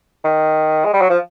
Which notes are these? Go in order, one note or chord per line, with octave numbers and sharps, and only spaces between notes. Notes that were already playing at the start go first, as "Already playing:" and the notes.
D#3
G#3
G3
F#3
F3